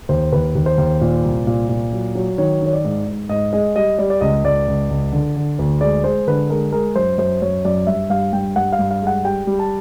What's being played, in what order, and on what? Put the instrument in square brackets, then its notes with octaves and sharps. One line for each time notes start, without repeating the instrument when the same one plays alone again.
[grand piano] D#2 C5
D#2 B4
D#2
C5
D#2
A#2
C2
A#2
A#2
F#3
F#3
D#3 C#5
D#3 C#5
D5
G#2
G#2
G#2 D#5
G#3 D#5
G3 D#5
G3 D5
D5
C#2 D#5
C#2 D5
C#2
C#2
D3
D3
D2
G#3 D5
G#3 C5
D3 B4
G#3 A#4
G#3 A#4
F#2 C5
F#2 C5
F#2 C#5
F#2 D5
G2 E5
G2 F5
G2 G5
G2 F#5
F5
G2
F5
G#3 F#5
G3 G5
G3
A5